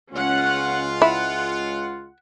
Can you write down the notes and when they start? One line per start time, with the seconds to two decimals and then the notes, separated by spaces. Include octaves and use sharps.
0.13 C#2 G#3 C#4 F4 F#5
1.02 E4 F#5